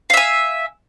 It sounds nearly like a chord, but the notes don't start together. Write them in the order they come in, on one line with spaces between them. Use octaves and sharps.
F5 E5 G#5